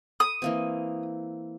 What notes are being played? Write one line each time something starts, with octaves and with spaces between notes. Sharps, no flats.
D#6
E3 A#3 C4